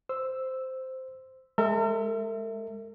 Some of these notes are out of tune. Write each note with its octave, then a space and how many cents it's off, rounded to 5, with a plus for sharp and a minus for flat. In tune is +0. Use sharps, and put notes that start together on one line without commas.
C5 -5 E6 +0
G#3 +0 A#4 -45 E5 +0